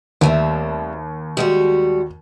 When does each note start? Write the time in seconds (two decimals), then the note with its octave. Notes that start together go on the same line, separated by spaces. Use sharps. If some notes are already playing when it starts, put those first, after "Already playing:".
0.21 D#2 G3 A3 C4
1.37 G3 G#3 F#4